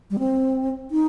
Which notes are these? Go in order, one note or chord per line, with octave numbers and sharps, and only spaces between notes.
G3
C4
D#4